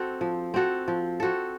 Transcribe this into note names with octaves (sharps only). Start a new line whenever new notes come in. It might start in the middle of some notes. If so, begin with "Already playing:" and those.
Already playing: C4 F#4 A4
F3
C4 F#4 A4
F3
C4 F#4 A4